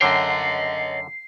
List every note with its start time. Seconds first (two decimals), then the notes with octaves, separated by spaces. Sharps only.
0.01 F#2 D3 C#5 D#5 G5 C7